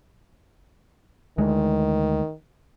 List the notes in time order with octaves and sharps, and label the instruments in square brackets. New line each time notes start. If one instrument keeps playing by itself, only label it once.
[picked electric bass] D2 G#3 [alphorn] D#3